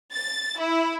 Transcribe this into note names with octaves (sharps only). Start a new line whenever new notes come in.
A6
E4